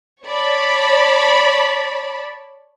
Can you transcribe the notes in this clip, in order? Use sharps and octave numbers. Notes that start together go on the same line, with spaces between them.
C#5 D5 A5 B5